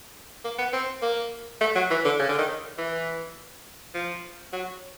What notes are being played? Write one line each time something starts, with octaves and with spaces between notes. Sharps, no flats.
A#3
B3
C4
A#3
A3
F#3
E3
D3
C#3
D3
D#3
E3
F3
F#3